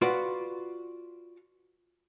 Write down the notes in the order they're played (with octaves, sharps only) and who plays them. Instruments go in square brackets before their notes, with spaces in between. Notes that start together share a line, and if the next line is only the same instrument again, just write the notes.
[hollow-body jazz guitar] F4 F#4 B4 D5